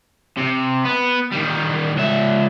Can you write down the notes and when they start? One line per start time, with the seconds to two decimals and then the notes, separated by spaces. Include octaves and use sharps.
0.38 C3
0.85 B3
1.32 D#3 G3
1.96 C#2 E5